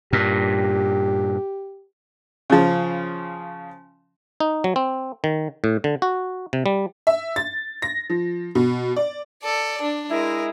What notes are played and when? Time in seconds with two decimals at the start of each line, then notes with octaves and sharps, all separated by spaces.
0.13 G2 A#2 G4
2.50 C#3 F3
4.40 D#4
4.64 F#3
4.76 C4
5.24 D#3
5.64 A2
5.84 D3
6.02 F#4
6.53 C3
6.66 G3
7.07 E5
7.36 A6
7.82 A#6
8.10 F3
8.55 B2
8.96 D5
9.43 A4 D5
9.82 D4
10.10 G#3 E4 A#4